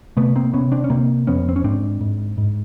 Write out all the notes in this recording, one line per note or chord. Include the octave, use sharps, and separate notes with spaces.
C3 A3 B3
A#3 C4
C3 B3 C#4
C4 D4
C#4
C3 A#3 C4
F2 B3 C#4
C4
C#4
G#2 C4 D4
G#2
G#2